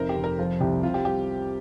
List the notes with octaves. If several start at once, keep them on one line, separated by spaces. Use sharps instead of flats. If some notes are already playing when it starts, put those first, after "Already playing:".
Already playing: F1 D#4 A#4 C5
G4
F1
A#4
F3 F4
C2 G4
C4 F4
G4
G3 G4